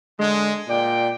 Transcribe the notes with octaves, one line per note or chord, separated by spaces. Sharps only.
D3 G#3
A#2 D5 G5